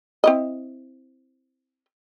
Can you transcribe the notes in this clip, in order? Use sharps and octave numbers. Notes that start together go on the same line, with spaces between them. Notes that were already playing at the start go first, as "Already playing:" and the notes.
C4 E4 D#5